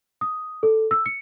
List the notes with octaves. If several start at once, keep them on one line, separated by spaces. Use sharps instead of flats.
D#6
A4
E6
C#7